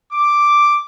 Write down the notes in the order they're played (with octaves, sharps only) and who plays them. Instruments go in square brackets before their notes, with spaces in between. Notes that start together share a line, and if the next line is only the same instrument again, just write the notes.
[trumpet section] D6